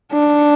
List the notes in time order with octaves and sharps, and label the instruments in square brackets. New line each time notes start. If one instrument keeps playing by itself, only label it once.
[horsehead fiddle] D4